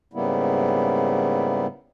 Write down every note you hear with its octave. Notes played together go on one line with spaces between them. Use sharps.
G#2 C#3 G3 A#3 B3 E4